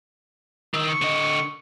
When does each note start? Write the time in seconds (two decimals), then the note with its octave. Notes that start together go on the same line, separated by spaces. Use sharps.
0.74 D#3 E6
0.89 C#6
1.02 D3 D#5